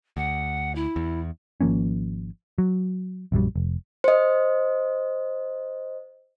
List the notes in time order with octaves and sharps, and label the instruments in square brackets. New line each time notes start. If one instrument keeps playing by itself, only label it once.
[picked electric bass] D2 [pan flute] F#5
[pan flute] E4
[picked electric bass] E2
G#1 F3 A#3 C#4
F#3
A#1 F#2 F#3 G3
F1
[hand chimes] C5 D#5